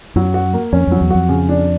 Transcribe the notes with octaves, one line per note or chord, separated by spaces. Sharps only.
F#2 F#3
F#4
A#3
F2 C#4
F2 F#3
E2
F2 F#4
C#3
D4